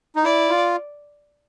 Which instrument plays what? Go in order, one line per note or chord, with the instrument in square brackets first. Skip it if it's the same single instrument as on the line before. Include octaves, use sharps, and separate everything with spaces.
[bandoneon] D#4
[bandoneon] E4 [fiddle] D5
[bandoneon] F4